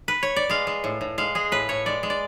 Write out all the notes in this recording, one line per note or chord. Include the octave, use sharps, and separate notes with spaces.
B4
C#5
D5
G#3 F5
G#3
A2
A2
G#3 F5
G#3 G#4
A2 B4
A2 C#5
G#3 D5
G#3
D5